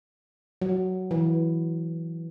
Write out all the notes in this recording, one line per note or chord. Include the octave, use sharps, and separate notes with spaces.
F#3
E3